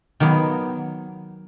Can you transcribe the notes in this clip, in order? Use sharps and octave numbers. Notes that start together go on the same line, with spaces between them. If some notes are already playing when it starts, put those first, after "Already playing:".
D#3 F#3 B3